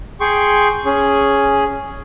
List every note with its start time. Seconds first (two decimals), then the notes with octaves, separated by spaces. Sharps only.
0.20 G#4 G5 C6 C#6
0.85 C#4 G#4